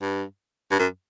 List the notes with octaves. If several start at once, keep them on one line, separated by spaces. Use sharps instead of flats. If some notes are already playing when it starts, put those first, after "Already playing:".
G2
G2
F#2